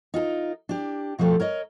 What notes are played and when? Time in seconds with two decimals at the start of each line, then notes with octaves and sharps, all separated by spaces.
0.14 D#4 F4 G#4 A#4
0.69 D4 G4
1.19 B2 F3 G3 A3 G4 A4
1.40 A#4 C#5 D#5